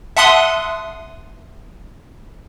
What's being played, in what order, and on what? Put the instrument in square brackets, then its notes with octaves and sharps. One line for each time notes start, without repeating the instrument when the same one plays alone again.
[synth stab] E5 F#5 A5 C6 D#6 F#6